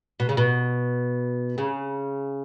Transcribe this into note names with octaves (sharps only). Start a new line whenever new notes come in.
B2
C#3
B2
C#3